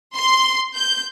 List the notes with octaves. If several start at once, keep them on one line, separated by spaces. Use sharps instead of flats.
C6
G6